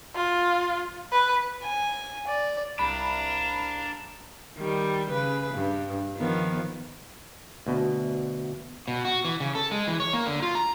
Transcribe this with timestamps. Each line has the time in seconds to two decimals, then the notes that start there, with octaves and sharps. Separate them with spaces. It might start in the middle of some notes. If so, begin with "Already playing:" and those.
0.15 F4
1.12 B4
1.63 G#5
2.27 D5
2.79 C2 D4 A#4 F5 B5
4.58 D#3 G3
5.11 C#3 B4
5.54 G2
6.18 D#3 F3 B3
7.67 D2 B2
8.88 B2
9.05 F#4
9.25 E3
9.40 C#3
9.55 A4
9.71 G#3
9.87 E3
10.00 C#5
10.13 A#3
10.26 D3
10.42 F4
10.55 A#5